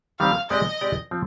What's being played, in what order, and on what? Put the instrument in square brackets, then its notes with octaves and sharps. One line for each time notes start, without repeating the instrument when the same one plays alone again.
[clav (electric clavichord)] D#3 G3 C4 [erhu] F5
[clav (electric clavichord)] G#3 C4 G4 D5 [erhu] D#5
[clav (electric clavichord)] G#3 C4 G4 D5
F3 C4